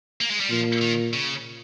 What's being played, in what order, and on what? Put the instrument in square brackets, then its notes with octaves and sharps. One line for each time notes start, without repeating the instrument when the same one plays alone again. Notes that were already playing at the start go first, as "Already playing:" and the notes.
[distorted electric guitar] A#3
G#3
G3
[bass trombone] A#2 [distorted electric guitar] F3
[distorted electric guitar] D#3
C#3